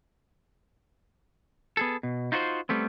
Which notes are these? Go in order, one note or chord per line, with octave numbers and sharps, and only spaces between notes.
B3 G#4 A4
B2
D#4 F4 F#4 A#4 C5
G3 A3 B3 C4